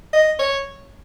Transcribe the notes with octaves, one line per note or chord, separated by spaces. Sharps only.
D#5
C#5